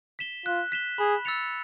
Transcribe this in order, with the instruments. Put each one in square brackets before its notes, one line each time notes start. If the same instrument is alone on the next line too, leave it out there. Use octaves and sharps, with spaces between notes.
[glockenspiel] B6 E7 G7
[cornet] F4 [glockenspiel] F#6
[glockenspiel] B6 E7 G7
[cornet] G#4 [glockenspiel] B5
[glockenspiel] E6 A6 C#7 F7